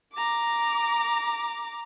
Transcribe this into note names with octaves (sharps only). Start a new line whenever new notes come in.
A#5 D6